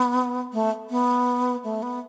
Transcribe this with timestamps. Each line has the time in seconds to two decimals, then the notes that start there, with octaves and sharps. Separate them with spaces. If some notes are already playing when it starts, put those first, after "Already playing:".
Already playing: B3
0.53 A3
0.90 B3
1.64 A3
1.82 B3